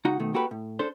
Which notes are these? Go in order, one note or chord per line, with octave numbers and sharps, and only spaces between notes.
C#2 D#4 F#4 F#5 A#5
B2 D#3 A3
A#3 F#4 G4 A4 B4
A2
D4 A4 C5